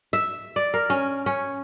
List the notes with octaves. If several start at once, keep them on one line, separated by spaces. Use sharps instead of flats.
E5
D5
A#4
C#4
C#4